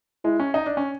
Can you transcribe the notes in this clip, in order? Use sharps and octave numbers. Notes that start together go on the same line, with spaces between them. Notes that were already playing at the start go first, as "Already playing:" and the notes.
G#3 E4
C#4
D#4
D4
C#4